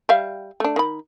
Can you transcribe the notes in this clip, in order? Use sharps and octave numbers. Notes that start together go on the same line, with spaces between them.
G3 E5 F5
A3 D4
D#3 B5